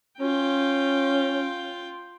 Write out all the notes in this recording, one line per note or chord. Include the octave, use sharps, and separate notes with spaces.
C#4 F4 G5